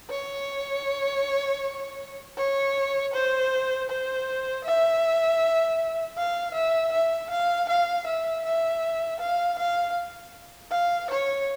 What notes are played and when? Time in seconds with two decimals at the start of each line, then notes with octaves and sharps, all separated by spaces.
0.10 C#5
2.37 C#5
3.13 C5
3.89 C5
4.64 E5
6.17 F5
6.54 E5
6.92 E5
7.30 F5
7.69 F5
8.06 E5
8.45 E5
9.20 F5
9.58 F5
10.71 F5
11.10 C#5